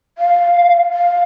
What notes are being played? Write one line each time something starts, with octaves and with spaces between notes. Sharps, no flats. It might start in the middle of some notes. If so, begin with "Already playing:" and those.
F5
F5